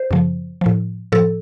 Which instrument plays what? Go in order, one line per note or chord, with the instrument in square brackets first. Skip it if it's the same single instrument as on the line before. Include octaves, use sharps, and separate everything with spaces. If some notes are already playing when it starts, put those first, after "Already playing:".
Already playing: [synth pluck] C5
F#2 C#3 F3
A2 F3
A2 F3 A4